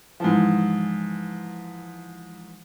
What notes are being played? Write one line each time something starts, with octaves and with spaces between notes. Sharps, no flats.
G#2 E3 F3